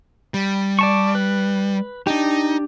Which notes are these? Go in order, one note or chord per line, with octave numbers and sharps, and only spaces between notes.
G3
D5 A5 C#6
B4
D4 D#4 G4